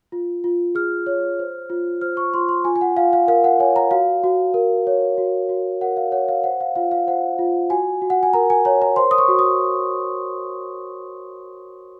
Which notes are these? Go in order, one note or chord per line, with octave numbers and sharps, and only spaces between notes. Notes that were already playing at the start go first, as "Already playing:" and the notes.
F4
F4
G#4 F6
C#5
C5
F4
C5 F6
C#6
F4 C6
C6
F4 G#5
G#5
F#5
F4 F5
F5
A#4 F5
F#5
C#5 G#5
A#5
F#4 F5
F#4
A#4
C#5
F#4
F#4
A#4 F#5
F5
C#5 F#5
F5
C5 F#5
F5
F4 F5
F5
C5 F#5
F4
F#4 G#5
F#4
F#5
G#5
A#4 A#5
G#5
C#5 A#5
A#5
C5 C6
D#6
C#6
F#4
D#6